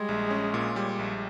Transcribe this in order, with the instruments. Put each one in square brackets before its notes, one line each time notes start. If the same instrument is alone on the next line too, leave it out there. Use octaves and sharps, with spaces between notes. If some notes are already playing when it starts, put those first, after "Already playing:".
Already playing: [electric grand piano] G3 [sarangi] G#3
[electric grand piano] A#1
C#4
A#2
G3
A#1